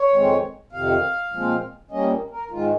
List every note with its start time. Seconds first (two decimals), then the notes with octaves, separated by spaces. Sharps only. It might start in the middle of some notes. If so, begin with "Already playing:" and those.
Already playing: C#5
0.13 F2 D#3 G#3 C4
0.72 F2 C3 D#3 F5
1.32 A#2 F3 G#3 C4
1.91 A#2 G3 A#3 C#4 D#5
2.31 A#4
2.50 G#2 D#3 G#3 F4